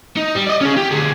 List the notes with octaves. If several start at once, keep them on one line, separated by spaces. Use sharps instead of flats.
D#4
G3
D5 D#5
C#4 G#4
G4
D2 G#4